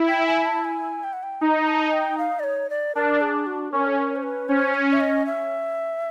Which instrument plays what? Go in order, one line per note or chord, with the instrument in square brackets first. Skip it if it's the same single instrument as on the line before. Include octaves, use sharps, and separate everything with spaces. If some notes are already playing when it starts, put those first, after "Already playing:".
Already playing: [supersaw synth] E4
[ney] G5
G#5
A5
G#5
G5
F#5
G5
[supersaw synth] D#4 [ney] A#5
[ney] A5
G5
F5
D5
C#5
D5
[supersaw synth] D4 [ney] A#4
[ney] G#4
F#4
[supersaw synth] C#4 [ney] A#4
[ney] A4
A#4
C5
B4
[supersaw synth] C#4 [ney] C5
[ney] C#5
E5
D#5
E5